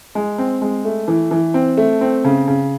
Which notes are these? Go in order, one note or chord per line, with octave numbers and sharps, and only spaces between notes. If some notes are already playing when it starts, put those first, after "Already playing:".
G#3
C4
G#3
A3
E3
E3
C4
A3
C4
C#3
C#3